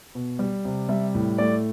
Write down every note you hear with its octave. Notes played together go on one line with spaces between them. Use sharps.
B2
G3
C3
G3 E5
A2
A3 D5